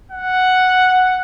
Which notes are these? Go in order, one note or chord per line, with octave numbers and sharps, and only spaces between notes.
F#5